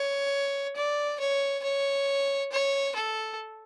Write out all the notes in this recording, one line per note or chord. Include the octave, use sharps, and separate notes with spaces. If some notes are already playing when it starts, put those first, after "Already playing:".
Already playing: C#5
D5
C#5
C#5
C#5
A4